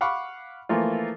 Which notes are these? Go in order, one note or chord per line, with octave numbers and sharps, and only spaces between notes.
F5 F#5 B5 C#6 D6
E3 F3 A3 A#3 F4